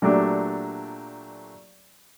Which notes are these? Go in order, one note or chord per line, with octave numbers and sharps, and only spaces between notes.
A#2 F#3 A3 D4 G4